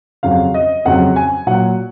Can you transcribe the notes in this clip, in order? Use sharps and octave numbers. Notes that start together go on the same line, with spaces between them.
F2 C#3 F#3 F5
D#5
F2 C#3 F#3 F#5
G#5
A#2 F#3 F#5